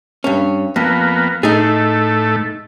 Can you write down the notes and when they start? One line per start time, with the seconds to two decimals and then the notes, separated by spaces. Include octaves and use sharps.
0.24 G2 C#4
0.76 F2 A#3 B3
1.43 A2 A3 D#4 G#4